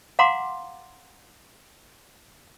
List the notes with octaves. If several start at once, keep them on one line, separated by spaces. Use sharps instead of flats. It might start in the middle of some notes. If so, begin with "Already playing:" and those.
F5 F#5 A#5 C6 D6